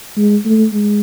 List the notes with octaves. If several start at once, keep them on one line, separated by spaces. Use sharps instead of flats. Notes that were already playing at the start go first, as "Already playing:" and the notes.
G#3
A3
G#3